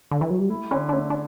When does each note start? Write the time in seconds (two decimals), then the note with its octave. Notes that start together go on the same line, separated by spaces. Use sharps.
0.11 D3
0.21 E3
0.30 F#3
0.40 G3
0.49 A3 E4
0.71 D3 C#4
0.89 D4
0.93 A3 C#4
1.10 D4